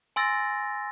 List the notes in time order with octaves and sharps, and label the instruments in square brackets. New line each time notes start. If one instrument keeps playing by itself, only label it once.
[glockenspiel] G#5 C6 E6 A6 A#6